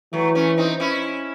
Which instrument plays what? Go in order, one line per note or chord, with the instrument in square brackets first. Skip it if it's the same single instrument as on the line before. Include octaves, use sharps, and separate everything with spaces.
[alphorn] E3 [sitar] F#3 A3
[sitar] A3 C#4
C4 D#4
C#4 E4